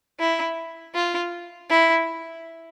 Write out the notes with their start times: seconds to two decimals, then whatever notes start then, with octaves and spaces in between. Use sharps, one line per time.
0.20 E4
0.95 F4
1.69 E4